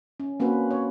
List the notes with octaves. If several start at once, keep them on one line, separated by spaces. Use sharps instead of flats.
C#4
A#3 C4 C#4 F#4 B4
C#5